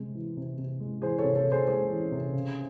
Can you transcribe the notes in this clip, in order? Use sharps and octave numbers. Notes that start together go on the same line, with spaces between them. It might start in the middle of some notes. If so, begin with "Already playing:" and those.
Already playing: C3 G#3
E3
C3
C3
G#3
E3 G#4 C5
A4 C#5
C3
A4 C#5
C3
G#4 C5
G#3 G#4 C5
E3
C3
C#3